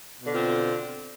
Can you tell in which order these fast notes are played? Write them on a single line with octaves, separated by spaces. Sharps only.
B2 D3 F4 C4